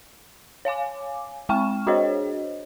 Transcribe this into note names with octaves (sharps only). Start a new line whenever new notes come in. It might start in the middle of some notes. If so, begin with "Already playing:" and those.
C#5 F5 G#5 D6
G#3 C4 G5 C#6 F6 E7
D4 F#4 G#4 C5 C#5 D#5